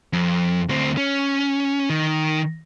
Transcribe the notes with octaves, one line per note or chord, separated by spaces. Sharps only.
F2
D2 C4
C#4
D#3